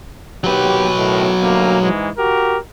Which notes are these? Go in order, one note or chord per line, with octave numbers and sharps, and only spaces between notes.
D#2 F#3 G4 B4
A2 D#3
D2 G2 A#3
G#2 E3 G#3
F#4 G4 A#4